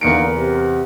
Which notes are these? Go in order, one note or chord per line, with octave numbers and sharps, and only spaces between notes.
E2 D3 A#3 D#4 A#4 C#7 D7
C3